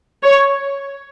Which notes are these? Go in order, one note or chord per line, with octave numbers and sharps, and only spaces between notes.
C#5